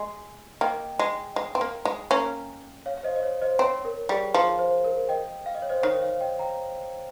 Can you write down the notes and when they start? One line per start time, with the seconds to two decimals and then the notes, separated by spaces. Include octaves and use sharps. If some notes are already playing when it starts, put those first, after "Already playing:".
Already playing: G#3
0.61 A#3 D#5 G5
0.99 G#3
1.36 G#3
1.55 C4
1.61 A#3
1.85 G#3
2.11 A#3 C#4
2.86 C#5 F5
2.97 F5
3.03 C5 D#5
3.16 D#5
3.23 C#5
3.42 C5 D#5
3.59 C4 C#5
3.85 A#4
4.09 G3 G#4
4.34 F3 G#4
4.59 C5
4.84 A#4
5.09 D#5 G5
5.46 F5
5.55 D#5
5.62 C#5
5.69 C5 D#5
5.83 D#3 C#5
6.02 C#5 F5
6.21 D#5 G5
6.39 G5 A#5